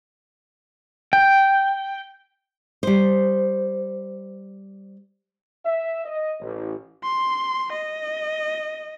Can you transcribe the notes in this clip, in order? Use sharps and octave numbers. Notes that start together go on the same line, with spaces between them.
G5
G3 C5
E5
D#5
A1
C6
D#5